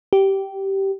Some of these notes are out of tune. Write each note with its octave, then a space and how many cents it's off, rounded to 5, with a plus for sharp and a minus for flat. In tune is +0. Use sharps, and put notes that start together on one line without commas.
G4 -15